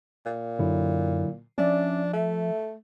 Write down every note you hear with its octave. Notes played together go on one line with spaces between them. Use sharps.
A#2
F#2 D3 F#3 E4
F3 C#4 D4 D5 E5
A3 E5